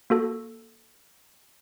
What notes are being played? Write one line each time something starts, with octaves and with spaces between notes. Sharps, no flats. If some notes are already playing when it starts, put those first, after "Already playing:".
A#3 F#4 A4